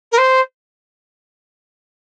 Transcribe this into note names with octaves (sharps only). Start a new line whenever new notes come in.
A#4
C5